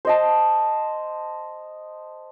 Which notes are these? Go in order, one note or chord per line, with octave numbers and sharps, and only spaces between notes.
C5 D#5 A5